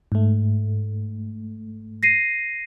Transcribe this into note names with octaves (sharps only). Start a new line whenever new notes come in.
G#2 A3
A#6 C7 D#7